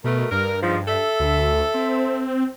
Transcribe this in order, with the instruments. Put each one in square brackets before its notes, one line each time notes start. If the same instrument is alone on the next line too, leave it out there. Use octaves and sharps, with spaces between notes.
[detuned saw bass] B2 [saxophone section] A3 A#4
[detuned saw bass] G2 [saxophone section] A#4
[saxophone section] G#2 F3
A4 E5
[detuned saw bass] D2
C4